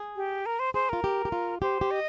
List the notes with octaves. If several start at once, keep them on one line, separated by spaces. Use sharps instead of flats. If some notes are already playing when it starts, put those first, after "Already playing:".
Already playing: G#4
G4
A#4
C5
G#4 C5
F4 A#4
G4
G4
F4
G4 C5
G4
D#5